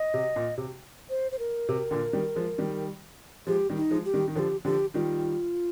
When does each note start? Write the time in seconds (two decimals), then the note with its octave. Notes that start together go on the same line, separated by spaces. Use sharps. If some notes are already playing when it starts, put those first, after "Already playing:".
Already playing: D#5
0.14 C3
0.36 A#2
0.58 C3
1.10 C5
1.32 C5
1.39 A#4
1.69 C3
1.91 A#2 D3
2.13 D#3 G3
2.35 F3 G#3
2.58 D#3 G3
3.47 F3 G#3 G4
3.69 D#3 G3
3.77 D#4
3.91 F3 G#3
4.05 G4
4.14 D#3 G3
4.28 D#3
4.35 D3 F3 A#4
4.39 G4
4.65 D3 F3 G4
4.94 D#3 G3 F4